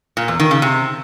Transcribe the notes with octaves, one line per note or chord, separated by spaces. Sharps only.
A#2
E2
D#3
C#3
C3